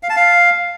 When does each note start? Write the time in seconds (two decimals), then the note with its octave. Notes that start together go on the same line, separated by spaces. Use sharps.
0.03 F5
0.10 A5
0.16 F5